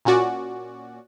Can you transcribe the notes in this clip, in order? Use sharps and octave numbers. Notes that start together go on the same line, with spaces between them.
A#2 C#4 F#4 D5